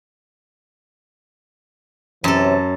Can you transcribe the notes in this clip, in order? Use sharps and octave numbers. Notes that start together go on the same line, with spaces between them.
F#2 C3 E3 A4 C#5